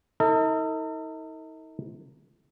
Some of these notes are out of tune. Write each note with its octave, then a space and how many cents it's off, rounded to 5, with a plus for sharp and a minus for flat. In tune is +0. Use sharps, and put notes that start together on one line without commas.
D#4 +40 A4 +45